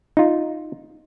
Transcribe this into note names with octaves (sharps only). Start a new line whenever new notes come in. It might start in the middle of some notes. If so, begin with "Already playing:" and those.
D#4 F4